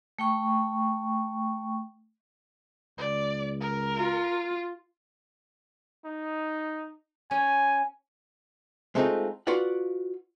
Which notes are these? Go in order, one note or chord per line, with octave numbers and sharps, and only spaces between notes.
A3 G5 C#6
C#2 D5
A#4
F4
D#4
C#4 G#5
G#3 A3 C4 D4 D#4 F4
F4 F#4 B4 D5 F#5